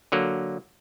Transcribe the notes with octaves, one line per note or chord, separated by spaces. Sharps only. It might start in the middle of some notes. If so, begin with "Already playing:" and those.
D3 F#3 A#3